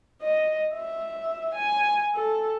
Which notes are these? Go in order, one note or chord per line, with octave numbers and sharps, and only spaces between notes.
D#5
E5
G#5
A4